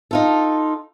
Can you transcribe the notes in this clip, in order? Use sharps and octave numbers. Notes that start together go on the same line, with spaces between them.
D#4 F4 A4